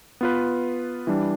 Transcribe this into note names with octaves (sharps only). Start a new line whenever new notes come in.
B3 F4 B4
E3 G3 D4